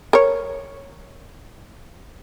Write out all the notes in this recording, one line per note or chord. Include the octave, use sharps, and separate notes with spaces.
A#4 C#5